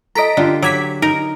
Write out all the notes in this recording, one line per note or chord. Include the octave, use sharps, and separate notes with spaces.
A4 D#5 A#5 B6 D7
D3 D4 F4 G4
F#3 D6 G#6 B6
D#4 A#4